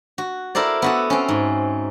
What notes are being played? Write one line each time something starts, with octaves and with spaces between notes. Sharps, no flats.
F#4
E4 A4 A#4 C5 D5
B3 F#4 A4
C4 C#4
G#2